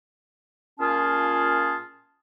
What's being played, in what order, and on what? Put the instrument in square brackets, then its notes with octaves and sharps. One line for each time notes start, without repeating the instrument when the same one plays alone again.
[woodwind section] A#2 C#4 F4 G#4 A5